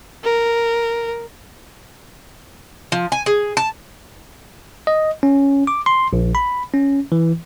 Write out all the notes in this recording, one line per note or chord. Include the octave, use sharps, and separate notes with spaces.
A#4
F3
G#5
G#4
A5
D#5
C#4
D6
C6
A#1
B5
C#4
E3